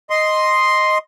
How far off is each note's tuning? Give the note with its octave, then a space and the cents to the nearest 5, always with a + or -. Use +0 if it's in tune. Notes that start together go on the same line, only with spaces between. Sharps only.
D#5 +0 C6 +0